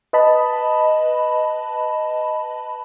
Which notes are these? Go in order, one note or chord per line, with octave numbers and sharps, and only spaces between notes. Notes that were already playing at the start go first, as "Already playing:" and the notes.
B4 D#5 A5 B5